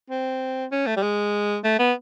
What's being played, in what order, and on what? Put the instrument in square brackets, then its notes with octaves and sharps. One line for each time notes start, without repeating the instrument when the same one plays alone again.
[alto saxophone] C4
C#4
A3
G3
G#3
A3
B3